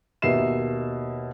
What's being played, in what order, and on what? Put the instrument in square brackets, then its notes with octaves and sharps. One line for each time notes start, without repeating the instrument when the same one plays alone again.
[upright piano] D#2 B2 A#4 E5 C7 E7